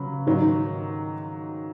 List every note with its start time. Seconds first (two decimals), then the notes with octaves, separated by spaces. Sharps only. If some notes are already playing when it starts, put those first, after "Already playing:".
Already playing: C#3 F#3 B4
0.26 G#2 D#3 F#3 D#4